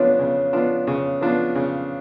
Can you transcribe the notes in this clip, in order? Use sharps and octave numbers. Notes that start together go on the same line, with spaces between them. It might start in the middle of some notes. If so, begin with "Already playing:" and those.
Already playing: C#3 F3 B3 D4 F4 C#5
C#3
F3 B3 D4 F4
C#3
F3 B3 D4 F4
C#3